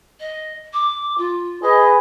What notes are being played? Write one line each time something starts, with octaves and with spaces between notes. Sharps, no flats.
D#5
D6
F4
G#4 B4 D#5